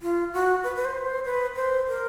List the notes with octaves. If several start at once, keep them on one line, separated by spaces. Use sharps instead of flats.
F4
F#4
B4
B4
C5
B4
C5
B4
C5
A#4